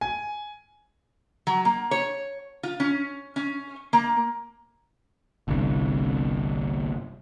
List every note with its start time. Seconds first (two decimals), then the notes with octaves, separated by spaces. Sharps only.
0.01 G#5
1.47 F#3
1.65 A#3
1.91 C#5
2.63 F4
2.80 C#4
3.36 C#4
3.93 A#3
5.48 G1 C2